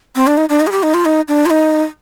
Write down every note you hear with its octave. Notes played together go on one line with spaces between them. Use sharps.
C4
D4
D#4
D4
D#4
G#4
G4
D#4
F4
D#4
D4
F4
D#4